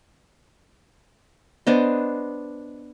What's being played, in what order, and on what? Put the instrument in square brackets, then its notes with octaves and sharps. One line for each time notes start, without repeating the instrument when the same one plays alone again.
[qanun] B3 D4 C5 D#5